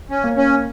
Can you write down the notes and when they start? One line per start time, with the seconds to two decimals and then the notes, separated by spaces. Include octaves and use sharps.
0.10 C#4
0.24 A#3
0.37 C#4